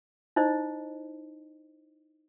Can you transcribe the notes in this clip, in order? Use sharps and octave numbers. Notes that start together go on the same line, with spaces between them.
D#4 E4 C5 D#5